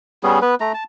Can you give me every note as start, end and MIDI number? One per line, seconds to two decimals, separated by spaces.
0.23 0.39 55
0.23 0.39 59
0.23 0.39 61
0.23 0.39 68
0.42 0.55 59
0.42 0.55 71
0.60 0.72 57
0.60 0.72 82
0.74 0.84 81